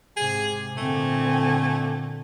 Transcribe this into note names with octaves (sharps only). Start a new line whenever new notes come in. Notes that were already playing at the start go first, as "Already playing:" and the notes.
G#2 C3 G#4
A#2 D3 A3 C4 G#5